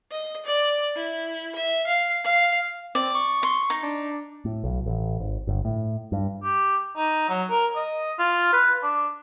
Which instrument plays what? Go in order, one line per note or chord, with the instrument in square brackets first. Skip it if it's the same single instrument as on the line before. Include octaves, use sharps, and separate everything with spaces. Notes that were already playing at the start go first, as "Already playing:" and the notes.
[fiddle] D#5
D5
E4
E5
F5
F5
[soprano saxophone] C4 [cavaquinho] D5
[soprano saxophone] C#6
[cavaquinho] C6
D#4
[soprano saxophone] D4
[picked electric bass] A2
B1
A1
G#1
G1
A2
G2
[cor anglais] G4
D#4
F#3
A#4
D#5
F4
B4
D4